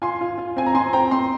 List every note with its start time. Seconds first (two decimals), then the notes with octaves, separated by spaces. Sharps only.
0.02 F4 G#5 C6
0.21 F4
0.38 F4
0.56 C4 G#5
0.66 A#5
0.75 C4 G#5 C6
0.93 C4 G5 A#5
1.11 C4 C6